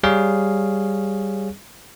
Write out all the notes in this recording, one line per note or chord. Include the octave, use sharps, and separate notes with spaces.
G3 G#4 C#5 F5